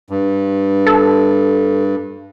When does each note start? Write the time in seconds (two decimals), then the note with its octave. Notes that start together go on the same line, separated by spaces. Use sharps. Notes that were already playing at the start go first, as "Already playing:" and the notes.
0.10 G2
0.86 A4